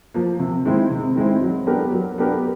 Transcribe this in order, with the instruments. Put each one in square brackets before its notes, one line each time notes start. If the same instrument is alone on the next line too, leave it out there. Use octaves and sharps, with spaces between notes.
[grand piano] F3 A#3
C3
D#3 G#3 C4 E4
C3
D#3 G#3 C4 E4
F#3
B3 D4 G4 A#4
F#3
B3 D4 G4 A#4